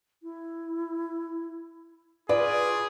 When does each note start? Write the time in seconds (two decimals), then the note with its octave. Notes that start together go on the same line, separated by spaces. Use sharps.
0.23 E4
2.29 F4 G#4 B4 D5